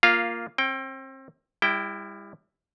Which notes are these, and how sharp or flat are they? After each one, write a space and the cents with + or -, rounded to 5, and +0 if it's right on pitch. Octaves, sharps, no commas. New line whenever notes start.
A#3 +0 F4 +0 F5 -10
C4 +35 G5 +0
G3 +35 E4 +0 G5 -5